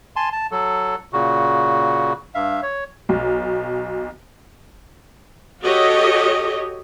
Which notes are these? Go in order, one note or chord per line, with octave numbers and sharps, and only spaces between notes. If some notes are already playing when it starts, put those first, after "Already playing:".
G#5 A5 C6
A5
F#3 A4
A#2 C#3 F#4
G2 E5 F5
C#5
B1
F#4 G4 A4 C#5 D#5